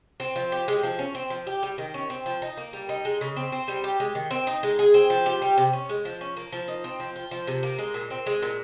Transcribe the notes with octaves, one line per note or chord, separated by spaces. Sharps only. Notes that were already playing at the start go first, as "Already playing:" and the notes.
C4
F3
G4
G#3
F3
C#4
C4
F3
G4
G3
D#3
C#4
C4
F3
D#4
A#3
G3
D#4
G#3
C#3
C4
C4
G3
G4
G#3
D#3
C4
D#4
G#3
G#4
C4
F3
G4
G3
C3
C#4
G#3
F3
C#4
A#3
F3
D#4
C4
F3
F4
F3
C3
A#3
G#3
A#2
C4
G#3
A#2